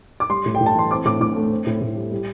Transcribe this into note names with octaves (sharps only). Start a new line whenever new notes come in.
D6
G3 C6
A2
G5
A2
A5
E3 C6
C4 D6
A2 D6
A2 D6
A3
C4
A2
A2
G3
G3